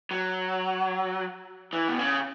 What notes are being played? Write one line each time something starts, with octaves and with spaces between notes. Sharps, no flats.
F#3
E3
B2
C#3